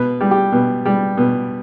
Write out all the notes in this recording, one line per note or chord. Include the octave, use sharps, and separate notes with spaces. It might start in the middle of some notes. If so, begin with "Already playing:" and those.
Already playing: B2 B4
G3
G4
B2
G3
B2